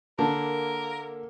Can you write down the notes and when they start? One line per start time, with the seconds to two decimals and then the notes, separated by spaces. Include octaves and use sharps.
0.19 D3 A#3 A#4 A5